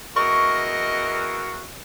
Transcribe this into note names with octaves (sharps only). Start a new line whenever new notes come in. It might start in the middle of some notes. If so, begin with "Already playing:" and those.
E2 F#4 A#4 D#5 C#6